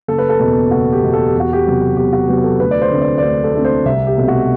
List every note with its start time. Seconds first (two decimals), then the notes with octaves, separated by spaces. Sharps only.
0.08 F#1 A4
0.18 B4
0.29 A4
0.40 E2 B2 A4
0.71 F#1 F#4
0.93 G4
1.03 E2 B2
1.13 A4
1.27 G4
1.34 E2
1.40 F#4
1.53 G4
1.66 C3 F#3 B3
1.97 E2 G4
2.13 F#4
2.29 C3 F#3 B3 G4
2.44 A4
2.60 D2 B4
2.71 D5
2.81 C5
2.91 D3 A3 C4
3.01 D5
3.18 D5
3.23 D2 C5
3.44 A4
3.54 D3 A3 C4
3.65 C5
3.85 C2 E5
4.07 G4
4.18 B2 A3 C4
4.28 F#4